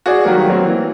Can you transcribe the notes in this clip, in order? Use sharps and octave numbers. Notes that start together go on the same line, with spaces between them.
F#4 G#4 D5
D#3 F#3 G3 A#3
F#3 A#3 C4
E3